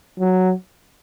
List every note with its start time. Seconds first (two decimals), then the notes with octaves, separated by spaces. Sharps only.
0.20 F#3